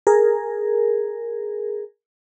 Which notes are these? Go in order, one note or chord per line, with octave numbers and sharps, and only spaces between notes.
G#4 A#4